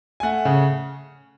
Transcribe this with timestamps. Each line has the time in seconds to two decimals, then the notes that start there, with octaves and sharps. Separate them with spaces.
0.20 G#5
0.23 A3 F#5
0.45 C#3